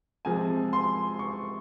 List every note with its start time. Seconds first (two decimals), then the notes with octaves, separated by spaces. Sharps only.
0.25 C3 F3 G#3 G#5
0.73 C6
1.19 C#6